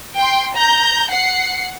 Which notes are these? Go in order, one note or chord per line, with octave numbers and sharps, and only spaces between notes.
G5 C6
A#5 G6
F#5 C7 C#7